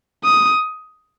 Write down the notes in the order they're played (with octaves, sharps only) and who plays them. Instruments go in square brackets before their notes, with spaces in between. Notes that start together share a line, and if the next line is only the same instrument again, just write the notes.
[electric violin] D#6